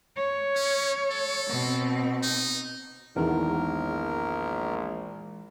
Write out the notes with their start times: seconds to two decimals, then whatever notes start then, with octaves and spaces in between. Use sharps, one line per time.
0.16 C#5
0.56 C#4
1.11 A4
1.49 B2 C4
2.23 D#4
3.16 A#1 E2 D#3 E3 G#3 A#4 F#5